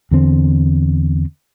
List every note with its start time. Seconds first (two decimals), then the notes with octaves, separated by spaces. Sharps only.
0.11 E2 D3 C4